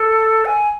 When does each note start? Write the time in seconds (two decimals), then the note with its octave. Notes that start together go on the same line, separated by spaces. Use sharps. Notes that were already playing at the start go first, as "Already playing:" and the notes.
Already playing: A4
0.45 G#5